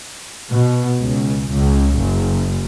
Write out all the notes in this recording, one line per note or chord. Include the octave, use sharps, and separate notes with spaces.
B2
C#2
C#2
F#1